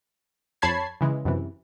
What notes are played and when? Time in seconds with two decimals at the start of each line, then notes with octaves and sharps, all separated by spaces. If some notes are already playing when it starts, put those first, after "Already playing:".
0.62 F2 C#5 A5 B5 G#6 C7
1.01 C#3 E3 G#3
1.25 F#2 C3 E3